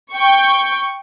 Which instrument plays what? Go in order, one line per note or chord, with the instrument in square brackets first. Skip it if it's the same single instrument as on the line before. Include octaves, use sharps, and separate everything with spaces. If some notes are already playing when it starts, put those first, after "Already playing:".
[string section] G5 C#6